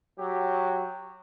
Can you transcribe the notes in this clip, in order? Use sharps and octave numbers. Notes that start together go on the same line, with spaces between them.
F#3 G4